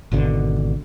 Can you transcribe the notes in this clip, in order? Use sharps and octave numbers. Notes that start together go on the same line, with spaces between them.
G#1 B2 D3